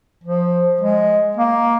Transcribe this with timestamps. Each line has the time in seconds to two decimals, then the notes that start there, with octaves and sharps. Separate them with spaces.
0.24 F3
0.81 G#3
1.37 A#3